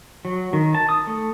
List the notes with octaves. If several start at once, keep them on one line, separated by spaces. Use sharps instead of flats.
F#3
D#3
A5
D#6
A3